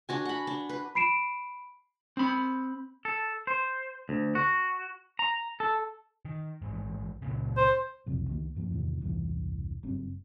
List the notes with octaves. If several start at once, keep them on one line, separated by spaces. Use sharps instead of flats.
D4 F#4 G#5
F#5 B5
D4
B4
B5 C7 D7 E7
C4 B5
A4
C5
D2
F#4
A#5
A4
D#3
A1 G#2
C#2 A#2 C#3
C5
F#1 C2 F2 C3
C#2 D#3 A#3
F#1 G2 F3 A#3
E2 A2 C3 D#3
E1 C2 G2 E3
F#1 G2 C4